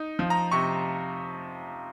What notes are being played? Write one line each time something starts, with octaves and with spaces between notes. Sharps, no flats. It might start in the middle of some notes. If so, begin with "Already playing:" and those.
Already playing: D#4
F3
A#5
C3 C#6